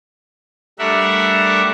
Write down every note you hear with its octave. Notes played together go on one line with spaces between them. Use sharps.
G3 A3 D4 A#4 E5 F#5